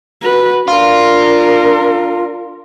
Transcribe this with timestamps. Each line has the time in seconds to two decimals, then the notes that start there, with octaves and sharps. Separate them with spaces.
0.22 F#4 B4
0.68 D4 F4 A#4